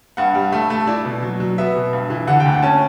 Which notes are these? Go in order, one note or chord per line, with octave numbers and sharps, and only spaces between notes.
G2 F#5
G3
A3
A3
E4 D5
B2
F#3
F#3
B3 E5
B2
G2
E3
D3 F#5
G5
D2
F#5
C#4 A5